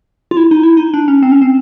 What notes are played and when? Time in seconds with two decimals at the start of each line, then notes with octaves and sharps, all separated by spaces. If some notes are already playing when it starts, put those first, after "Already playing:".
0.31 F4
0.37 E4
0.51 D#4
0.63 E4
0.77 D#4
0.94 D4
1.08 C#4
1.23 C4
1.32 C#4
1.42 C4